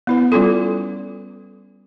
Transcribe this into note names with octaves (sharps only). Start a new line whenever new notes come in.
B3 E4 B4
G3 C#4 F4 A4